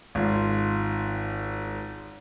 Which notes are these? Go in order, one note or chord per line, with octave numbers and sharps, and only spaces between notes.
G#1 F4